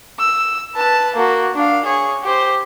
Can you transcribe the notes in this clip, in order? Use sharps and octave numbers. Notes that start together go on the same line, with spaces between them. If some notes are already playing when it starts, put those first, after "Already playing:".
E6
B4 A5
A#3 F#4
D4 F5
G#4 C#5
G4 C5